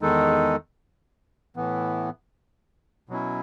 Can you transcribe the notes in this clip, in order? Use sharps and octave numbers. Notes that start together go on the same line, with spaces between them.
E2 D#3 G#3 D#4 A4
A2 E3 B3
B2 F#3 C#4 E4